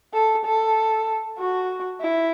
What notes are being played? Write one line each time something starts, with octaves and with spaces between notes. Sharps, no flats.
A4
A4
F#4
E4